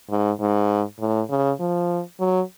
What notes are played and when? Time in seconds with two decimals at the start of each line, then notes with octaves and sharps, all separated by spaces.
0.10 G#2
0.41 G#2
1.00 A2
1.30 C#3
1.60 F3
2.20 F#3